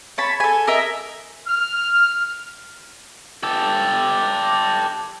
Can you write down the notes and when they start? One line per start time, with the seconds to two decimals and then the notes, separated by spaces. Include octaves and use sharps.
0.18 C#5 A5 B5
0.40 A4 G#5
0.67 A#4 D#5 E5
1.48 F6
3.43 G4 A4